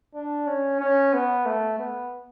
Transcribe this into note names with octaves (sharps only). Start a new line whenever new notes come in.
D4
C#4
C#4
B3
A3
B3